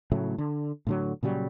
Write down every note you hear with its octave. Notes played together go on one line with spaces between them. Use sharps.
A2 C#3 F#3 A3
D3
A2 D3 F#3
A#2 C#3 F#3 G3